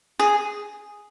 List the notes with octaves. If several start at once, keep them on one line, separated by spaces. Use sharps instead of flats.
G#4